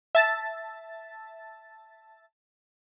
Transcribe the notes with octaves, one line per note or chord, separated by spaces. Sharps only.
E5 A5 A6